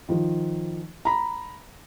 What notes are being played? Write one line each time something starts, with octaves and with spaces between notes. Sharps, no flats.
D#3 F3
A#5 B5